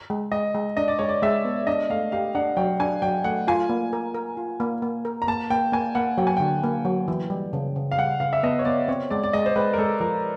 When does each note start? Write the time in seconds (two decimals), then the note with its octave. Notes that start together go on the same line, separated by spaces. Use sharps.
0.10 G#3
0.32 G#3 D#5
0.55 G#3
0.77 D4 D#5
0.88 D5
0.99 G#3 C#5
1.09 D5
1.23 G#3 E5
1.45 B3
1.67 D4 D#5
1.90 A3 F5
2.12 G4 F5
2.35 D4 F#5
2.57 F#3 G5
2.80 D4 G#5
3.02 F#3 G5
3.24 A3 F#5
3.48 F4 G#5
3.69 A#3
3.93 A#4
4.15 A#4
4.37 F4
4.60 A#3
4.82 A#3
5.05 A#4
5.22 A#5
5.28 A#3 A5
5.50 A#3 G5
5.72 A#3 G#5
5.95 A#3 F#5
6.18 F#3 G5
6.27 G#5
6.37 D3 G5
6.64 A#3
6.85 F#3
7.08 E3
7.30 G3
7.53 C#3
7.76 C#3
7.91 F5
7.98 G3 F#5
8.20 C#3 F5
8.33 E5
8.43 B3 D#5
8.59 C#5
8.65 B3 D5
8.88 C4 C#5
9.10 G#3 D5
9.24 D5
9.33 G#3 D#5
9.46 C5
9.56 G#3 B4
9.73 A#4
9.78 G#3 A4
10.00 F3 A#4